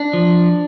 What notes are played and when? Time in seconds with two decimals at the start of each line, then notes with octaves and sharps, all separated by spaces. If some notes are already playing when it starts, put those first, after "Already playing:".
Already playing: D4
0.13 F3